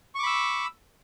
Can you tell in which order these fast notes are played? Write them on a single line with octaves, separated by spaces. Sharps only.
C#6 D6 B5 E6